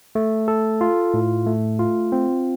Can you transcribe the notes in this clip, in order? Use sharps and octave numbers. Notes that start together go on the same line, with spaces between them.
A3
A4
F4
A2
A3
F4
C4